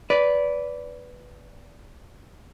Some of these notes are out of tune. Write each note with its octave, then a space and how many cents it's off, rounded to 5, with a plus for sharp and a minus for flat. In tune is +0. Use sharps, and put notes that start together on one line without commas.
B4 +0 D5 -20